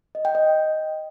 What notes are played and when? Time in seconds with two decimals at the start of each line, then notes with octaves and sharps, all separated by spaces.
0.15 D#5
0.25 G5
0.35 D#5